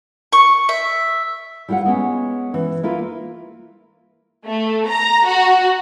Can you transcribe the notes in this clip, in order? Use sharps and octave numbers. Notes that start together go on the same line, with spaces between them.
C#6
E5
G3 E4 F4 B4 F#5
G#3 B3 C#4
E3
A#3 E4 F4 A#4 B4
A3
A#5
F#4